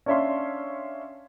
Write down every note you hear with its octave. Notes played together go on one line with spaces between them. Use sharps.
C#4 D4 C#5 E5 F5 C6